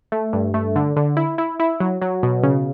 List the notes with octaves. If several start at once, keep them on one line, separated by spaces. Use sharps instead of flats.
A3
G2
A3
D3
D3
E4
E4
E4
F#3
F#3
B2
C#3